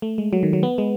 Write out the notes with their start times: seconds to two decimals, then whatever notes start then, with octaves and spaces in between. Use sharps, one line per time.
0.02 A3
0.18 G#3
0.33 F#3
0.43 D#3
0.53 F#3
0.63 B3
0.78 G#3